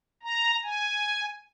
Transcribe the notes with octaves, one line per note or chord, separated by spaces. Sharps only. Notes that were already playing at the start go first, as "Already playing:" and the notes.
A#5
G#5